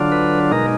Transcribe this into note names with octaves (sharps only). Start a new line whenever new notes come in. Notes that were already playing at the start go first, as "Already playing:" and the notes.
Already playing: D3 F#3 D4 F4
B4
B2 G#3 D#4 A#4